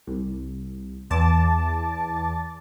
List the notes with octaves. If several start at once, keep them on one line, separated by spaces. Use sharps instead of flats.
C2
E2 A5 D6 A6